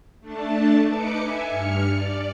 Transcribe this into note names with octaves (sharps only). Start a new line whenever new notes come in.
A3 D4 A5
D#4 B4 D6 C#7
E5 G#5
G2 F6 C#7
D5